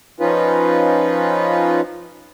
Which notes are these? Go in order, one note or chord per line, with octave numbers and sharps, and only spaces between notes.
F3 C#4 D#4 F4 B4